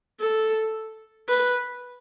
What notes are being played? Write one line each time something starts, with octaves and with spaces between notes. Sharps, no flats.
A4
B4